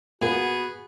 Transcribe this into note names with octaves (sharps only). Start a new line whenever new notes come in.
A#2 A#3 B3 F#4 G#4